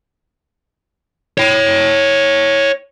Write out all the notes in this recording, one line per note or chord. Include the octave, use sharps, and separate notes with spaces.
C#5 G5